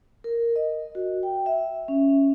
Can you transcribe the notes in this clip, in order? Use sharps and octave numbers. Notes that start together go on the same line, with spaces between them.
A#4
D#5
F#4
G5
E5
C#4